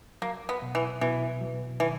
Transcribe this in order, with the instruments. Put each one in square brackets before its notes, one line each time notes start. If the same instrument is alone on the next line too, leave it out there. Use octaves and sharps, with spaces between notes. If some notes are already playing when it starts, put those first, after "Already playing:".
[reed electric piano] F#3 [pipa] A#3
[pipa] B3
[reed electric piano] B2
[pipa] E3
[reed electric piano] B2 [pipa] E3
[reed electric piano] F#3
[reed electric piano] D#3 [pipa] E3